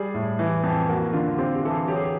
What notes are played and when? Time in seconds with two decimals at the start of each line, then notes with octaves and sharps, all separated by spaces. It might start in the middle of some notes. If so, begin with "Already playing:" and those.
Already playing: G3 G#4
0.14 A2
0.39 E3
0.63 F2
0.89 A#3 F#4
1.13 D3 F4
1.38 C4 G4
1.55 G4
1.63 E3 A4
1.71 G#4
1.88 F#3 G4
1.96 G#4
2.03 G4